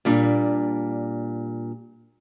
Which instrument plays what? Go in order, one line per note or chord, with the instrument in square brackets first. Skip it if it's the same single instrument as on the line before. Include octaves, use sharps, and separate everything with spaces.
[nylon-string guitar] A#2 G3 D4